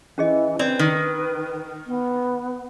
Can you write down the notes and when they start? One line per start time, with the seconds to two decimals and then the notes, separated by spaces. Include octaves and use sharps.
0.18 E3 C#4 G#4 D#5
0.59 C4 B4 D5
0.79 D#3
1.87 B3